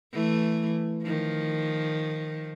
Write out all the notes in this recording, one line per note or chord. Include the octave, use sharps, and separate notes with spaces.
E3 A3
D#3 F3